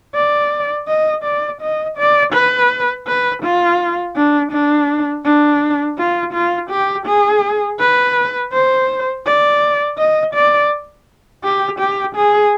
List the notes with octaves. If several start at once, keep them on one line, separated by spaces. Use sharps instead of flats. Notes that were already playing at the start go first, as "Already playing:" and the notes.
D5
D#5
D5
D#5
D5
B4
B4
F4
D4
D4
D4
F4
F4
G4
G#4
B4
C5
D5
D#5
D5
G4
G4
G#4